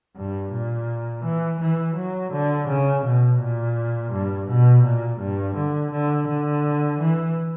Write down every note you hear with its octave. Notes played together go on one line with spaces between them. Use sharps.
G2
A#2
E3
E3
F#3
D3
C#3
B2
A#2
G2
B2
A#2
G2
D3
D3
D3
E3